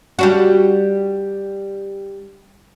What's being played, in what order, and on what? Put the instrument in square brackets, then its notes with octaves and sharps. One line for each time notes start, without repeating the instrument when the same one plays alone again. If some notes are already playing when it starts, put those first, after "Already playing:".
[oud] G3 D4 F#4